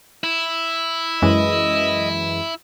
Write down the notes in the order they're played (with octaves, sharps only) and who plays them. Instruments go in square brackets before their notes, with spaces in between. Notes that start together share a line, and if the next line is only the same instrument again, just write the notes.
[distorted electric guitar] E4
[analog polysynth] F#2 E3 G#3 [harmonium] D#5